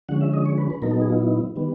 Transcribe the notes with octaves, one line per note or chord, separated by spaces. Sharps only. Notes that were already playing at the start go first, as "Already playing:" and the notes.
D3 F3 G#3 C#4 F#5
E5
D#5
C#5
B4
B4
A#2 F#3 B3 D#4 A#4
A4
G#4
F4
E4
D#3 G3 B3